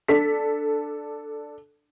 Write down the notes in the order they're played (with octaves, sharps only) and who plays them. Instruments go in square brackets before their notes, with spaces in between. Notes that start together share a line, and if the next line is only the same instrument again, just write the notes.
[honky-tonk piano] D4 A4 B6